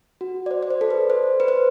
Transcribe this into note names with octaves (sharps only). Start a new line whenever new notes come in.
F#4
D5
C5
D5
C5
A4
B4
C5
B4
C5